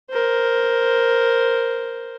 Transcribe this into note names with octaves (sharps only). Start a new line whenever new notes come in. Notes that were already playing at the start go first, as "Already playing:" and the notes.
A#4 C5